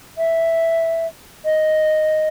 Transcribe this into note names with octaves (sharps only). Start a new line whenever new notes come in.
E5
D#5